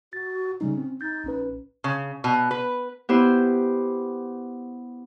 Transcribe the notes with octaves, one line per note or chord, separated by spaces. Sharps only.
F#4 A6
C#3 G3 C#4 D#4
C4
D#4 G6 A6
A#1 C#4 B4
C#3
B2
B4
B3 E4 G4 C5